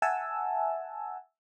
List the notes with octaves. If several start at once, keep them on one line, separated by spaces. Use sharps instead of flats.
E5 F#5 G#5 A5 E6